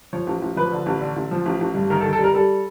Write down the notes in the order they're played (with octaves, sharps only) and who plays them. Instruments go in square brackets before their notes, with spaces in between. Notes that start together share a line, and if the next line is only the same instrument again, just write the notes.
[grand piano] F3 C#5
A1
A1
F3 B4
D3
A1
D3
A1
F3
A1
A1
G2
D#3 A#4
A4
D#3
A4
G3 A#4
G3 A4